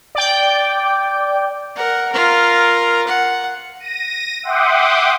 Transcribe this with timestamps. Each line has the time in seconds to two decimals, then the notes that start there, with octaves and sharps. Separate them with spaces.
0.15 D5 G5
1.76 A#4 F#5
2.12 F4 A#4
3.07 F#5
3.80 A#6 D#7
4.43 E5 F#5 G5 C6 D6 D#6